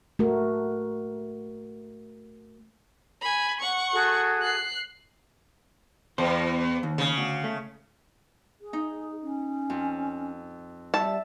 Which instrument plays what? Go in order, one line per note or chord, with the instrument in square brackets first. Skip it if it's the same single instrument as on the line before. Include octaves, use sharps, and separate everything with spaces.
[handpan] A3 F#4 A#4
[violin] G#5 B5
F#5 C#6
[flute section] F#4 G#4 A4
[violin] F#6 C7
[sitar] E2 [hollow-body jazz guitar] C5
[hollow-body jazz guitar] D#2
[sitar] C#3
[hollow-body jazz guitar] D2
A3
[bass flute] G#4
[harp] D#4
[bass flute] C#4
[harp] F2
[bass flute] G3 [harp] E5 [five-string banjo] A5